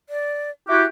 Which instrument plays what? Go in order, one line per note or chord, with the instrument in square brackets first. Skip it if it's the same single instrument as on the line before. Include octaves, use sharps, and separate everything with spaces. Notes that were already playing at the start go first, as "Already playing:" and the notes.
[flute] D5
[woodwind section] E4 F#4 G4 [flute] F#6